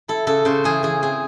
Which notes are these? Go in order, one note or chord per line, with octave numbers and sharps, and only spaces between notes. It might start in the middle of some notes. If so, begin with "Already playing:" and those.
E4 A4
C#3 A4
C#3 C5
E3 G#4
E3 G#4
C4 G#4